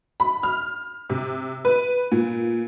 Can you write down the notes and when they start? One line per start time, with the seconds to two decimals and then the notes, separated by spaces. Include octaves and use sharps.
0.20 B5
0.43 F6
1.10 C3
1.65 B4
2.12 A#2